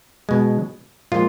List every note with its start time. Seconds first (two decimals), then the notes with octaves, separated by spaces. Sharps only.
0.29 B2 G#3
1.12 A#2 F3 G#3 F4